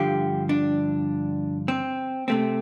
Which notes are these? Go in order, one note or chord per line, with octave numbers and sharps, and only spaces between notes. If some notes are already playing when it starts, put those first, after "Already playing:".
Already playing: G2 D3 F3 G4
D4
C4
C3 A3 C4